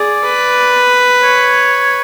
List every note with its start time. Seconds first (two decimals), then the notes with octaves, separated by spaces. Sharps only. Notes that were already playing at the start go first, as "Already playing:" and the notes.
Already playing: G#4 D5
0.25 B4
1.23 C#5